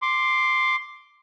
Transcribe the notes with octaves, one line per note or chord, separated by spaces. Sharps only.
C6 D6